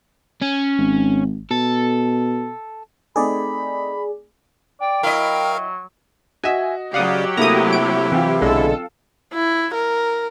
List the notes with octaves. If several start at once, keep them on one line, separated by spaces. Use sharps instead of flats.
C#4
G#1
B2 A4
A3 C4 D#4 G#4 D5 B5
D5 G5
F#3 E4 A#4 D#5 F5
F#4 D#5 E5 G#5
C#3 F#3 G4 D5 F5 F#5 D#6
C3 A3 A#3 E4 A#5 D#6
D7
E3 C4 F4
B1 D3 G#3 A4
E4
A#4